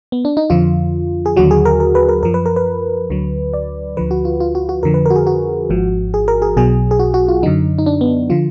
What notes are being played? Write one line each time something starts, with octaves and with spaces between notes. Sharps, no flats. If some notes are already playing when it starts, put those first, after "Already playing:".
B3
D4
D#4
F2 D3 F3 F4
G#4
D#2 D3 F#3 F#4
G#4
A#4
A#4
B4
A#4
F#2 F3 A#4
B4
A#4
B4
D2 D3 F#3
D5
D2 D3 F3 B4
F#4
F4
F4
F#4
F#4
F2 D3 F3 A#4
B4
A#4
F#4
G#4
F#4
G#1 G#2 F3
G#4
A#4
G#4
B1 B2 F#3 G#4
G#4
F#4
F#4
F4
F#2 D3 F#3 D#4
D#4
D4
B3
D3 F3 F4